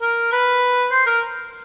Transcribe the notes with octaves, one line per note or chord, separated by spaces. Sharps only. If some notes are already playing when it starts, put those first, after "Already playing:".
A#4
B4
C5
A#4